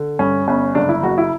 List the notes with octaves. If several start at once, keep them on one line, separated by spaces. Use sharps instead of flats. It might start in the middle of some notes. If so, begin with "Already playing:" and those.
Already playing: D3
G2 C#4
G1 C#4
F#1 D4
E4
F#1 F#4
E4